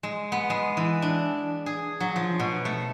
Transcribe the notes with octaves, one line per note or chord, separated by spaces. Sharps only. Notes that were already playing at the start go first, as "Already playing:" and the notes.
G#3
B3
G#3
E3
D4
G#4
F#3
F3
B2
A3